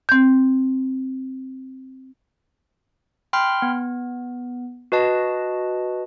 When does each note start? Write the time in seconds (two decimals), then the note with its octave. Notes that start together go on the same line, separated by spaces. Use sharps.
0.09 C4 G6
3.33 G5 B5 C6 F6
3.62 B3
4.92 F#4 B4 D#5 A5